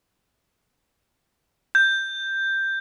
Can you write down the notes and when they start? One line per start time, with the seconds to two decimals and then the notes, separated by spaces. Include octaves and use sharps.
1.75 G6